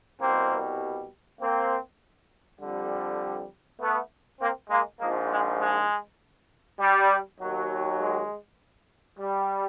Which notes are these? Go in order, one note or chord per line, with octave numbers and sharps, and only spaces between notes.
C2 B2 G3 A#3 C4
A#3 C4
F2 D3 G3
A3 B3
A#3 C4
G#3 A#3
A#1 G#2 F3 G#3 A#3
G#3
G#3
G3
D#2 D#3 F#3
G#3
G3